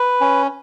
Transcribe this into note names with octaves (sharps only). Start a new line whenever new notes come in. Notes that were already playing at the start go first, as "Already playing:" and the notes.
Already playing: B4
C#4